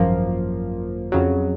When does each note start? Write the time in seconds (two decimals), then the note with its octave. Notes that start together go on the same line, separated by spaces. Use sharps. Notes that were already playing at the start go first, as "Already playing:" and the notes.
Already playing: G#1 F#2 F3 A#3
1.12 F2 C#3 F#3